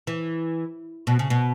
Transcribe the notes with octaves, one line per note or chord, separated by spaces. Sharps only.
E3
B2
C#3
B2